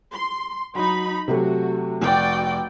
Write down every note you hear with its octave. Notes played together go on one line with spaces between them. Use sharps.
C6
F#3 D#4 B5
C3 F#3 A3 F#4
F1 F#4 D5 G5